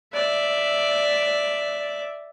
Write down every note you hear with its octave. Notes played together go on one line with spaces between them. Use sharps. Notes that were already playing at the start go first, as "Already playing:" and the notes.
D5 E5